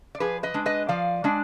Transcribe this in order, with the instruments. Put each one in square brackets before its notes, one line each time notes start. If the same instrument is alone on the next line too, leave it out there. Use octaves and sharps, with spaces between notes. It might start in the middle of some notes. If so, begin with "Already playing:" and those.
[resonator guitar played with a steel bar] D5
F3 G#4 B4
B4 D#5
G#3 D4
B4 D#5
F3 D5 F5
G#3 D4